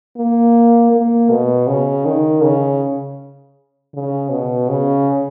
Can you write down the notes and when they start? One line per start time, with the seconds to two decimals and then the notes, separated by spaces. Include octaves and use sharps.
0.17 A#3
0.92 A#3
1.30 B2
1.68 C#3
2.05 D#3
2.43 C#3
3.94 C#3
4.31 B2
4.69 C#3